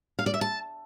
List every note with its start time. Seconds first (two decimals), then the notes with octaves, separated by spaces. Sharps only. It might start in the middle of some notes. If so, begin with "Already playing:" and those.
0.19 F5
0.26 D5
0.34 E5
0.41 A5